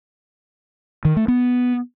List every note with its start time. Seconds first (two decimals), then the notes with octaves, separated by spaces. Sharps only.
1.05 D#3
1.17 A3
1.28 B3